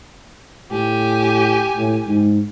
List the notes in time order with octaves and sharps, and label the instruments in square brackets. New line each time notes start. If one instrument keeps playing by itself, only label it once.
[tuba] A2 [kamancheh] G4 G#5
[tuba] A2
G#2